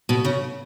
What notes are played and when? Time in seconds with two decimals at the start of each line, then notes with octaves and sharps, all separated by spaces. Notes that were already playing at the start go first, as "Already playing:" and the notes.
0.09 B2
0.25 C#3